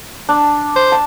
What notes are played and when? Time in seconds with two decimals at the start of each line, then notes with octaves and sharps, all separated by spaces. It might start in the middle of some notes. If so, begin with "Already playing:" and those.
0.29 D4
0.76 C5
0.92 A5